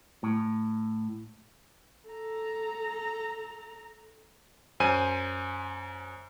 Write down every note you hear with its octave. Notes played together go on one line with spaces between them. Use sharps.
A2
A4 A#5
F#2 C5 G#5 D#7